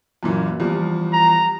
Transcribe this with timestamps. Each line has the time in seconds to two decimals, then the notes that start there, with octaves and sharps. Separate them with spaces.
0.23 F#2 A#2 E3
0.60 E2 F3 G3
1.13 A#5